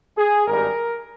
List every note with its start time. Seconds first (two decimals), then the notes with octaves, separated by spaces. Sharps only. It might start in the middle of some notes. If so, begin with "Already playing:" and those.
0.17 G#4
0.47 G#1 G2 G3 A#4